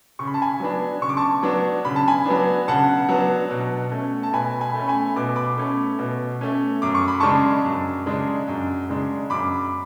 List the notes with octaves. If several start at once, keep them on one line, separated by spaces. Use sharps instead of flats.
C#3 C#6
B5
A5
G#5 B5
F#3 B3 D4
C#3 C#6
D6
A5 C#6
F#3 B3 D4
C#3 B5
A5
G#5 B5
F#3 B3 D4
C#3 F#5 A5
F#3 B3 D4
B2
A3 C#4
A5
B2 G#5 B5
G#5 B5
A3 C#4
G#5 B5
B2 D6
B5 D6
A3 C#4
B2
A3 C#4
F#2 D6
C#6
B5
C#3 G#3 D4 A5 C#6
F#2
C#3 G#3 D4
F#2
C#3 G#3 D4
F#2 B5 D6